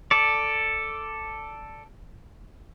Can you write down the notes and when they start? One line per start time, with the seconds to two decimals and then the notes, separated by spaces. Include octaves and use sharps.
0.11 A4 D5